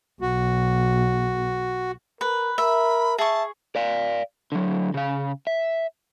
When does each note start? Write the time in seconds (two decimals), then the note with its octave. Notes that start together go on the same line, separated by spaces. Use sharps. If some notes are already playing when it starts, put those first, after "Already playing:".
0.21 B1 F#4
2.21 A#4 B4
2.58 A#4 E5 B5
3.18 G#4 E5 A5 C#6
3.75 D5 F5
4.52 D3 F#3
4.94 C#3 F5
5.47 E5